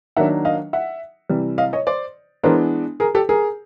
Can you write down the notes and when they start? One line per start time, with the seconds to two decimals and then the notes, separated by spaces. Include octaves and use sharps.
0.16 D#3 F#3 A#3 D4 E5 F#5
0.45 D#5 F5
0.73 E5 F#5
1.29 C3 E3 G3
1.58 D#5 F5
1.73 C#5 D#5
1.87 C5 D5
2.43 E3 G#3 B3 D4 A#4 C5
3.00 G#4 A#4
3.15 G4 A4
3.29 G#4 A#4